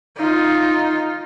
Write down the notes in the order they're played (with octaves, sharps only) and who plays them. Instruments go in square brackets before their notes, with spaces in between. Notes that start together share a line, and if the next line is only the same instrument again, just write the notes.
[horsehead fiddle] D#4 F4